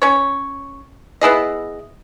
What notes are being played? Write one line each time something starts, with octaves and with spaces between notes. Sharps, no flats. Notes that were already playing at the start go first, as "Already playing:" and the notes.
C#4 C#5
B3 E4 G#4 D#5